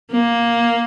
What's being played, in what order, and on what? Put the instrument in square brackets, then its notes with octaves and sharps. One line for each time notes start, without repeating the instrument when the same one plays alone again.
[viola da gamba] A#3